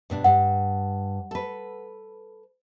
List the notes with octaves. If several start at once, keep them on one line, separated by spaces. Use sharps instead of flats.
G2 B2 D4
G2 F#5
A4 B4